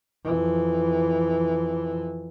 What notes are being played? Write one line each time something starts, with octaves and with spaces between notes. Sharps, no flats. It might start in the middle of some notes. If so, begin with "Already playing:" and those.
F2 E3